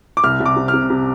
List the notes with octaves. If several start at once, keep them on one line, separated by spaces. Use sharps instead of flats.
D6
C2 F6
C2
D6
C3
F6
C3
C3